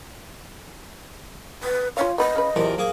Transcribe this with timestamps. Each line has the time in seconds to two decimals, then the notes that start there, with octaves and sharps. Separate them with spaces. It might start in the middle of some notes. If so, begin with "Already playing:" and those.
1.63 B4
1.97 F4 C#5 F5
2.18 B3 B4 D#5
2.36 C#3 B4
2.56 E2 C3 F3 A#4
2.78 A#3 G#4